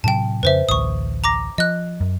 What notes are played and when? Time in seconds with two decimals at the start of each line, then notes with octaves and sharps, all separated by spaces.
0.04 A2 C3 F#3 G5 A5
0.43 F2 C#3 B4 C5 E5
0.69 A1 D2 C#6 D#6
1.24 A#5 D6 A#6
1.58 F3 D#5 F#6
2.01 F#2